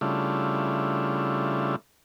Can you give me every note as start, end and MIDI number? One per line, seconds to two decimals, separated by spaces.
0.01 1.76 49
0.01 1.76 55
0.01 1.76 57
0.01 1.76 62
0.01 1.76 64
0.01 1.76 65